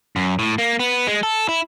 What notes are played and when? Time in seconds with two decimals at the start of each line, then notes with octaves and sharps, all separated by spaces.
0.16 F#2
0.39 A2
0.58 A#3
0.80 B3
1.07 G#3
1.23 A4
1.49 E4